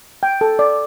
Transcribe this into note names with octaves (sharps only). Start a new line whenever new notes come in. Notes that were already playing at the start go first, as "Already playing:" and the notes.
G5
A4
D5